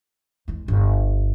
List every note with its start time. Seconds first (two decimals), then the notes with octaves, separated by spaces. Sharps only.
0.48 E2 G#3
0.68 G1